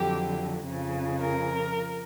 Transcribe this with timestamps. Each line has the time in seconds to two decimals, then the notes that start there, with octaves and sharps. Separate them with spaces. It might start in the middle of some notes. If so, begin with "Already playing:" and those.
Already playing: F2 D3 F#3 G4
0.65 F2 C#3 F3
1.20 A#4